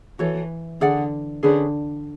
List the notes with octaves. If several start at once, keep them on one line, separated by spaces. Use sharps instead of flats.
E3 F#4 A4 C#5
D3 G#4 D5 F#5
D3 C#4 G#4 B4